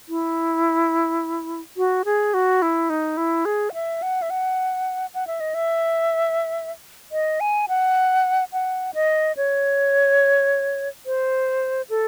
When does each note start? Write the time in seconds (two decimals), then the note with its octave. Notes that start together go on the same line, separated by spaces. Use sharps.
0.09 E4
1.77 F#4
2.05 G#4
2.34 F#4
2.62 E4
2.90 D#4
3.17 E4
3.45 G#4
3.70 F#5
3.74 E5
4.02 F#5
4.22 E5
4.30 F#5
5.14 F#5
5.27 E5
5.40 D#5
5.54 E5
7.12 D#5
7.40 G#5
7.68 F#5
8.53 F#5
8.94 D#5
9.37 C#5
11.06 C5
11.90 A4